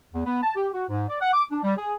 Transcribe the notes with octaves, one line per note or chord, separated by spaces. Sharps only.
E2
B3
A5
G4
F#4
G#2
D5
F#5
D6
D4
G3
G#4